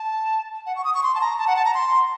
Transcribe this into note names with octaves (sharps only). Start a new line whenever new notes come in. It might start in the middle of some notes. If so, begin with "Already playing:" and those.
Already playing: A5
F#5
C#6
D#6
C#6
C6
A5
A#5
A5
F#5
A5
A#5
C6